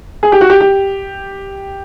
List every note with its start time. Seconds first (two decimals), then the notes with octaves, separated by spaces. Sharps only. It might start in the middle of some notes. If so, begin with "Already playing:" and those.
0.23 G#4
0.32 G4
0.41 F#4
0.50 G4
0.61 G4